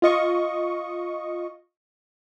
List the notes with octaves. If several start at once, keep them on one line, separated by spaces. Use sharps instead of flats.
F4 D#5 C#6